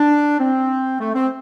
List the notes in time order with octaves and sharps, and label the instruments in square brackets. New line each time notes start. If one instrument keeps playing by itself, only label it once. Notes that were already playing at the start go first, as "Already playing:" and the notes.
Already playing: [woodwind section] D4
C4
A3
C4